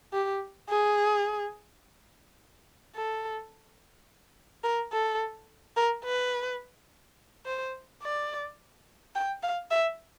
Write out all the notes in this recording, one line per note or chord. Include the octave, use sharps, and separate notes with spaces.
G4
G#4
A4
A#4
A4
A#4
B4
C5
D5
G5
F5
E5